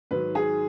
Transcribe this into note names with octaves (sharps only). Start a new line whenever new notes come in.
G#2 D#3 F#3 B4
G#4